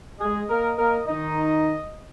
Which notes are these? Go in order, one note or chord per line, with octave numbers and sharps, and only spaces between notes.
G#3 G#4 D#5
A#3 A#4
A#3 A#4
D#3 D#4 D#5